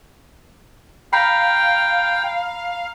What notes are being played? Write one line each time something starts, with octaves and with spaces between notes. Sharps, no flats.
F5 G5 A#5 B5